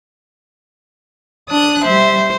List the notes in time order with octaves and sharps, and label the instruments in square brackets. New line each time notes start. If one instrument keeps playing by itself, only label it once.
[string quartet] D4 D#6 F#6
[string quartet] G3 E5 [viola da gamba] C5